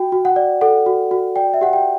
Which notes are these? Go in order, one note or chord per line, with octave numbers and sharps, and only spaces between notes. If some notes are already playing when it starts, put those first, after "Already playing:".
Already playing: F#4 G5
F#4
F#5
D5
A4 F#5
F#4
F#4
D5 G5
E5
G4 F#5
G5